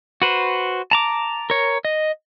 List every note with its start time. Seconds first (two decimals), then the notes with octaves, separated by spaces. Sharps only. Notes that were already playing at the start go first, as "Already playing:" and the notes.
0.22 F#4 B4 C5
0.91 A5 A#5 D6
1.50 A#4 C#5
1.85 D#5